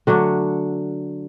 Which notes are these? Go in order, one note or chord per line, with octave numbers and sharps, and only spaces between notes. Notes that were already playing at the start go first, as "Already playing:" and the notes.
D3 F#3 A3 D4